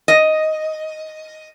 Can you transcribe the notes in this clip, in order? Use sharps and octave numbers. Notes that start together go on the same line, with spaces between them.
D#5